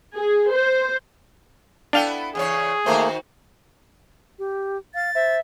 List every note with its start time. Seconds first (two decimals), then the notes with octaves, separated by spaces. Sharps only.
0.15 G#4
0.51 C5
1.93 B3 D4 E4 A4 F5 G5
2.35 E2 C#3 G#4 C#5
2.86 D#3 A3 A#3 F#4 C5
4.39 G4
4.94 F5 A6
5.15 C5 E5